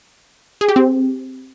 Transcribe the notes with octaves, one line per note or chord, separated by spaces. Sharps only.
G#4
G4
C4